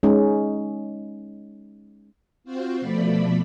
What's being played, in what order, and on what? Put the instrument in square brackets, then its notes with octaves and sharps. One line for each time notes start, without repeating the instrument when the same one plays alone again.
[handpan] G#3 C#4 D#4
[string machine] C4 F4 F#4 C5
B2 F3 A3 D5 B5